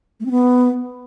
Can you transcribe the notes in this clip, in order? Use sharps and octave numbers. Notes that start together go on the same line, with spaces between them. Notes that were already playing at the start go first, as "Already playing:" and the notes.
A3
C4
B3